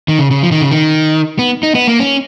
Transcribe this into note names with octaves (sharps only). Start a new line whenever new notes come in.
D#3
C#3
C#3
F3
D#3
C#3
D#3
B3
D#4
B3
A#3
C#4